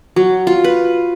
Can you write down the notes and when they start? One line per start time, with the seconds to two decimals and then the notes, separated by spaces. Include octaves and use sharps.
0.16 F#3
0.47 F4
0.64 B4